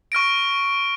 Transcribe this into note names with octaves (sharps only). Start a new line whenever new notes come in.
C#6 F6 A#6 D7